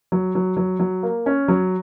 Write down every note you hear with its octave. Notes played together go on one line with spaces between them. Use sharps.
F#3
F#3
F#3
F#3
A#3
C#4
F#3